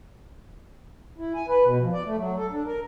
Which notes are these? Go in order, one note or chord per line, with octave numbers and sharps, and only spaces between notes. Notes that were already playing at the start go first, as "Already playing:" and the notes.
E4
G#5
B4
B2
F3
D5
A3
F#3
A4
D4
A#4